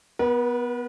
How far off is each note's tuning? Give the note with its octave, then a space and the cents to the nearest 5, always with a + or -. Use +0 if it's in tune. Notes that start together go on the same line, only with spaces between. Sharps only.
B3 +0 B4 -45